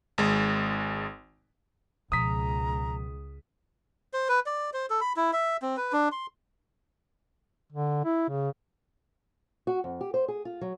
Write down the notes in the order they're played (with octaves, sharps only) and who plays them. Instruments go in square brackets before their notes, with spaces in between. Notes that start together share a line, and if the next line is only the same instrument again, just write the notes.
[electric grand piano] G#1 G#3
[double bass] C#2 [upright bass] B2 F3 [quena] A#5 [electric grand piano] D#6 B6
[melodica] C5
B4
D5
C5
A4
B5
E4
E5
C4
B4
D4
C6
[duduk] D3
E4
C#3
[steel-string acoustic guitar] F#4
F2
G4
C5
G#4
F4
F#3